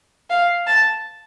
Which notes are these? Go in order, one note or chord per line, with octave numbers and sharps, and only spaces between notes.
F5
A5